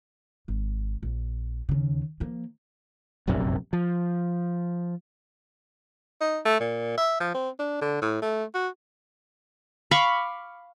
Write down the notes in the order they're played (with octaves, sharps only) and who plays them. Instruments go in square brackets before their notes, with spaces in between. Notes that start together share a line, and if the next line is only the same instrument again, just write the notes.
[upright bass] G#1
A#1
D#2 C#3
F3 A#3
[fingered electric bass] F1 A#1 F#2 C3
F3
[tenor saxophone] D#4
A3
A#2
E5
F3
C4
D4
D3
A2
A3
F#4
[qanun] F5 B5 C#6 D6